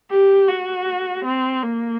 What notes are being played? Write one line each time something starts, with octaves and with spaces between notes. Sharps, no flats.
G4
F#4
C4
A#3